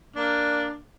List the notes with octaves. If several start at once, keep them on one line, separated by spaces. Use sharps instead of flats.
A#3 D4